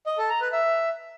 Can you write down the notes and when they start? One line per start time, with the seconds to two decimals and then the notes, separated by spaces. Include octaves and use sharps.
0.07 D#5
0.18 A4
0.29 A#5
0.41 B4
0.52 E5